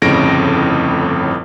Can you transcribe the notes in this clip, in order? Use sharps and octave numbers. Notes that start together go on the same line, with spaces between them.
G1 F2 A2 C#3 A#6 D7